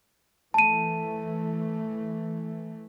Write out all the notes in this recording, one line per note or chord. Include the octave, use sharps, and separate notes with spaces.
E3 A3 A5 D#7